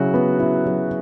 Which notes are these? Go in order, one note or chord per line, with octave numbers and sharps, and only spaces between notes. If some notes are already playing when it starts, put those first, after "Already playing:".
Already playing: C#3 F#3 E4 F#4
B3
E4
F#3